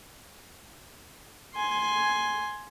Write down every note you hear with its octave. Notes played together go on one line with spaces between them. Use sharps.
G#5 C6